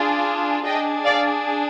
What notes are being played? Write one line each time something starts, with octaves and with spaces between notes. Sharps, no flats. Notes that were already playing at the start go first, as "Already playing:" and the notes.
Already playing: D4 F4 G#4
D4 G#4 D#5 G5
D5 F5